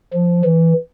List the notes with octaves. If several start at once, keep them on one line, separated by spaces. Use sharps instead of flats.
F3
E3